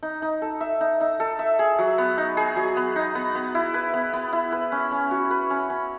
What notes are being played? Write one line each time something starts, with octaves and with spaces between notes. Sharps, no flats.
D#4
D#4
A4
E5
D#4
D#4
A4
E5
G#4
F#3
B3
D#4
G#4
F#3
B3
D#4
B3
B3
E4
B4
B3
B3
E4
B4
C#4
C#4
F#4
B4
C#4
C#4